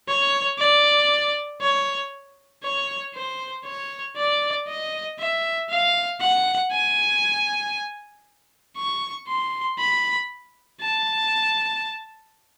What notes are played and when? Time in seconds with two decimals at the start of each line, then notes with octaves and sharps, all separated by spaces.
0.08 C#5
0.58 D5
1.61 C#5
2.63 C#5
3.14 C5
3.65 C#5
4.17 D5
4.68 D#5
5.19 E5
5.70 F5
6.21 F#5
6.72 G#5
8.77 C#6
9.28 C6
9.79 B5
10.81 A5